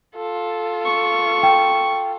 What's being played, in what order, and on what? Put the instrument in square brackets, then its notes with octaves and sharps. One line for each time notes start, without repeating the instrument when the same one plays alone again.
[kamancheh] F4 A4
[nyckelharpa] C#6
[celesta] G5